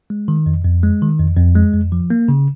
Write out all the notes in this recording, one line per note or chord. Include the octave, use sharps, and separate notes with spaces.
G#3
D#3
F2
F2
G#3
D#3
F2
F2
G#3
F2
F3
A#3
C#3